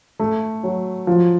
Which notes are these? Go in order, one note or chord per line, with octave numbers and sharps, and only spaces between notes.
A3
F#3
F3